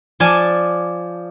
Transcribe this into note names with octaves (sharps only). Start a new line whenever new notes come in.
F3 D5 G#5 A5